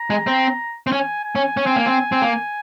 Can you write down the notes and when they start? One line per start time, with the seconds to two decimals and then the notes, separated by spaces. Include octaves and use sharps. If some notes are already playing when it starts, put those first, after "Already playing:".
Already playing: A#5
0.10 G#3
0.27 C4
0.87 C4
0.92 C#4 G#5
1.24 G#5
1.35 C#4
1.57 C#4
1.66 C4
1.76 A#3
1.86 C4
2.12 C4
2.22 A#3